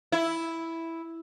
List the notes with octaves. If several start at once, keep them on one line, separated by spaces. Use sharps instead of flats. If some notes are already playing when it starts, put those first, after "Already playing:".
E4